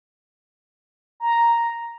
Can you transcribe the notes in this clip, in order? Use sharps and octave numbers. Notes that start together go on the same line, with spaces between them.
A#5